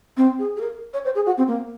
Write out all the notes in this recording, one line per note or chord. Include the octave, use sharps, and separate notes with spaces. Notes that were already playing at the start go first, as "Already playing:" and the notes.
C4
G#4
G#4
A#4
C#5
C5
G#4
F#4
C4
A#3